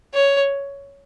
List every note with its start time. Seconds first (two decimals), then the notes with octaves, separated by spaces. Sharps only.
0.14 C#5